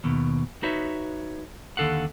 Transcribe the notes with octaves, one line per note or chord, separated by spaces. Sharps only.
D#2 B2
D#4 F#4 B4 C#5 E5
D#2 D3 A4 F5 F#5